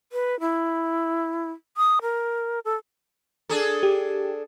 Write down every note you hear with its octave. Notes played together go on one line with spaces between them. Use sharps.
B4
E4
D#6
A#4
A4
D4 G#4 A4
G4